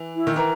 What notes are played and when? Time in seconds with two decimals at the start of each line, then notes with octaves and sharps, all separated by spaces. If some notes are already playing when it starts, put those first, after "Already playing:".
Already playing: E3
0.15 E4
0.27 D#3
0.36 E3 A#4